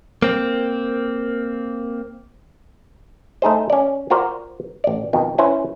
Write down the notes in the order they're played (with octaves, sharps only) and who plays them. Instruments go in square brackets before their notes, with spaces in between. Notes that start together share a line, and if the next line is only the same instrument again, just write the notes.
[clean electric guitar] A#3 C4
[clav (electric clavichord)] A3 D#4 G#4 C5
C#4 D5
F4 F#4 A#4 C5 D5
A1 D5
F2 B2 D#3
C#4 E4 B4 C5 G#5